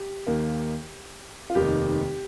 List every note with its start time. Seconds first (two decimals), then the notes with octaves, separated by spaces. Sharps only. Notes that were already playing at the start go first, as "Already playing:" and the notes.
Already playing: G4
0.27 D#2 D#3 A#3
1.50 F4
1.55 F1 D#2 D#3 G4